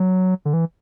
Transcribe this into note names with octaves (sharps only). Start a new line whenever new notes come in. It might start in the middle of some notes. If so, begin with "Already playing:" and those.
Already playing: F#3
D3
E3